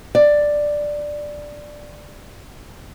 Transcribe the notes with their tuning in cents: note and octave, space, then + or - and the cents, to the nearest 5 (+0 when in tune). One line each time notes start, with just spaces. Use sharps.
D5 +5